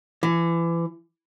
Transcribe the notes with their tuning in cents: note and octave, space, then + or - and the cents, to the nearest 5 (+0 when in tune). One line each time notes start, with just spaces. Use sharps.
E3 +30